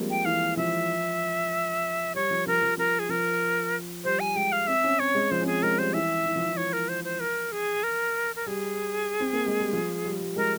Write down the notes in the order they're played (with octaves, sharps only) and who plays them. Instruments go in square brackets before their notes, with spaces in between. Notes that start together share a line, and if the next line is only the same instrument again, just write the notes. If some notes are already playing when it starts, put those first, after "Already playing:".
Already playing: [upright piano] F3 G3 G#3 A#3 C4
[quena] G5
[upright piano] E3 [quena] F5
[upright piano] F3 [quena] E5
[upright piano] G3 [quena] C#5
[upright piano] F3
[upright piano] F3 [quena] A#4
[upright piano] F3
[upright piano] F3 [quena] A#4
[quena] G#4
[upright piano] F3 [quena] A#4
[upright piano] G3 [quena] C5
[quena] G#5
[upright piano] G#3 [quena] G5
[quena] F5
[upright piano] C4 [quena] E5
[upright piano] C#4
[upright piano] C4 [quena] C#5
[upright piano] G#3
[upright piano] F3 [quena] C5
[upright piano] C#4
[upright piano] C4 [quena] G#4
[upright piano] G#3 [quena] A#4
[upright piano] G3 [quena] C5
[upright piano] E3 [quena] E5
[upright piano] E3
F3
E3
[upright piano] E3 [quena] C#5
[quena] A#4
C5
C5
A#4
G#4
A#4
A#4
[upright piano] G3 [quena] G#4
[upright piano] C4
A#3
G#3
G3
F3
G3
G3
[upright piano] G#3 [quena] A#4